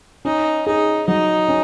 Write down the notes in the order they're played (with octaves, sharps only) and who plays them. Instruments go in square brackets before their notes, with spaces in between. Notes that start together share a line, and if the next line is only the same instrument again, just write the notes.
[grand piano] C#4 [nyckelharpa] D#4
[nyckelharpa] D#4 [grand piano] G#4
[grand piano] F#3 [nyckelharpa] D#4
[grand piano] C#4